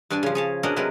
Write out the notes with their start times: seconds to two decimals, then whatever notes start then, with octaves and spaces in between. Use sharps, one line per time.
0.10 G2 D4 D5 G#5 A5
0.23 C#3 F3
0.35 G#4 C#5 A5
0.63 B2 C#4 D4 A#4 D#5 F#5
0.76 C3 F#3 G#3 C#4 A#4 B4